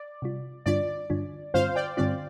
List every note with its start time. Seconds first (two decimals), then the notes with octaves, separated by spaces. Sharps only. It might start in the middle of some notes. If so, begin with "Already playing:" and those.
Already playing: D5
0.22 C3 G3 F4
0.66 G2 D3 G3 D4 F4 D5
1.10 G2 D3 G3 D4 F4
1.54 G2 D3 G3 C4 F4 C5 F5
1.76 D5 G5
1.97 G2 D3 G3 C4 F4 D5